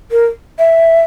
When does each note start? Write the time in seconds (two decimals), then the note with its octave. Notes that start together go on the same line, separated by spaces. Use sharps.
0.11 A#4
0.59 E5